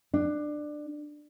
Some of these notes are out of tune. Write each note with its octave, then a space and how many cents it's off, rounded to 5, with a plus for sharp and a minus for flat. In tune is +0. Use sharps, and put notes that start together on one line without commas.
D4 +20